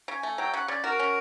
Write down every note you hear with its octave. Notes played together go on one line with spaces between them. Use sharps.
C#3
G#5
A3
F#3 G5
C#3 F#5
C#3 D5
F#4 A#4
C#4